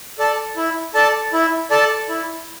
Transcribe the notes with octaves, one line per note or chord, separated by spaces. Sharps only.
A4 D5 A5
E4
A4 D5 A5
E4
A4 D5 A5
E4